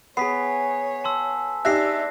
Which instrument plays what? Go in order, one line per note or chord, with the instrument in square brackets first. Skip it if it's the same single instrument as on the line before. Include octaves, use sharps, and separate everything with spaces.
[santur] B3 G#4 [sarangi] C#5 [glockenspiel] G#5 B6 C7
[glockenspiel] A5 C6 E6
[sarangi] D4 [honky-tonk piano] D#4 G4 E5 [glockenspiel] F#6 A#6 C7